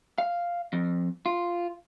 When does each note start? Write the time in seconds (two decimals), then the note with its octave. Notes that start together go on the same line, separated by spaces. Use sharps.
0.18 F5
0.73 F2
1.26 F4